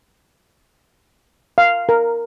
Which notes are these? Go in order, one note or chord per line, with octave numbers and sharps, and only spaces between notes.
F5
A#4